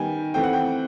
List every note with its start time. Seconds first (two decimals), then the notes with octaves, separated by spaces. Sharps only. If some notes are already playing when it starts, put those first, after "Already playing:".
Already playing: D#3 G3 B3 G5 G#5
0.34 E3 A3 C4 G5
0.43 F#5
0.53 G5